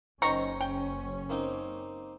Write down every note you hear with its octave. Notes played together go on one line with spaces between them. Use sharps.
F#1 D#3 C#4 C5 C#5 A#5 C#6
G5
A#3 C4 D#4